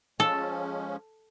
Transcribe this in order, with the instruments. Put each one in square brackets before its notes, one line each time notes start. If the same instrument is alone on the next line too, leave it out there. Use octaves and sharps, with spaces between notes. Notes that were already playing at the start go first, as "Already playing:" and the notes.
[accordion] F3 G#3 C#4 [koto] A4